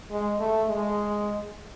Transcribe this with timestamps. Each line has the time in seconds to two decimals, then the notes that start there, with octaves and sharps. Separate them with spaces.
0.11 G#3
0.40 A3
0.69 G#3